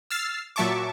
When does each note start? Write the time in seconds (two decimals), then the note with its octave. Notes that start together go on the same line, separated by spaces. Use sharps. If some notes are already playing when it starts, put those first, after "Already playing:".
0.10 E6 F6 A6 C7
0.56 A#2 F#3 E5 A5 C#6 D6